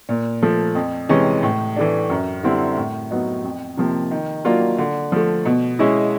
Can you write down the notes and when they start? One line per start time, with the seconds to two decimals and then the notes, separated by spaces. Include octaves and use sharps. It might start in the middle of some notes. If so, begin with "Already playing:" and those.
0.09 A#2
0.42 F3 A3
0.75 F2
1.09 C3 E3 G#3 C#4
1.43 A2
1.76 E3 A3 D4
2.10 F#2
2.43 D3 G3 C4 E4
2.77 A2
3.11 F#3 B3 D#4
3.44 F2
3.77 C3 F3 A#3
4.11 D#3
4.45 F#3 A#3 D4 F4
4.78 D3
5.12 F3 A3
5.45 B2
5.79 G#3 C#4 E4